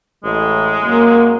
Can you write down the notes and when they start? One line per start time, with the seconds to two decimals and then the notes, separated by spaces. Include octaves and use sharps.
0.24 A1 G#3
0.84 F#2 A#3